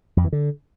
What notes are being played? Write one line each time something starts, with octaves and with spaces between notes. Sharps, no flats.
F2
E3
D3